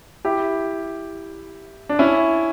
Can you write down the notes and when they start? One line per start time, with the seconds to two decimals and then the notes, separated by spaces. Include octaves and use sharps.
0.25 E4 G4
1.89 D4
1.99 C#4 E4